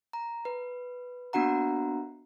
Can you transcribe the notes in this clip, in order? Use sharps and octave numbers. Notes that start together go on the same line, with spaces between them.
A#5
B4
A#3 B3 D4 F#4 F#5 A#5